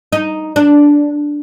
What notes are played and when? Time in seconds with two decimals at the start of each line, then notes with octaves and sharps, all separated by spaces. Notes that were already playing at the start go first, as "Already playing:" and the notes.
0.12 D#4
0.56 D4